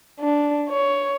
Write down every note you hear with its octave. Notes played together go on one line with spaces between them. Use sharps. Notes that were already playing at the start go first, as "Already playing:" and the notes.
D4
C#5